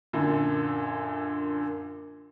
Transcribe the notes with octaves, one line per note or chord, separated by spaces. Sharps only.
F#2 A#2 D3